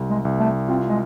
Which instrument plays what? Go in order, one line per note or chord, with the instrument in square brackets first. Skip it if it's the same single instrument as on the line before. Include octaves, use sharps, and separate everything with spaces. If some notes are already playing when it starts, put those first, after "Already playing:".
Already playing: [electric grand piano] C2
[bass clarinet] G#3
[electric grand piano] C2
[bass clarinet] A3
[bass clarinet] C4 [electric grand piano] F4
[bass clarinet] G#3